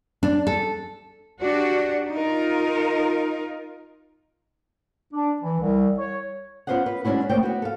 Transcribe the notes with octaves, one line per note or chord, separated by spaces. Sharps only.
D4
A4
D4 F#4 G4
D#4 F4 A#4
D4
E3
C2
C#5
B3 C#4 F4 C5 D#5 F#5
B4
D2 G#3 C#4 D4 E4 F#4
D2 A#3 C5 C#5 G5
B3 E4 F#4
A4 F5